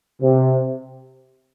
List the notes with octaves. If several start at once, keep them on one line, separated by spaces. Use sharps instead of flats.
C3